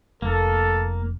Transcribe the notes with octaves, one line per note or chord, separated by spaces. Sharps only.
F1 A#3 A4